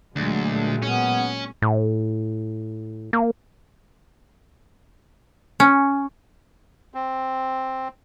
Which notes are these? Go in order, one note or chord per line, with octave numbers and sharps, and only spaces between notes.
D2 A#2 F#3 G#3
B3 C#4
A2
A#3
C#4
C4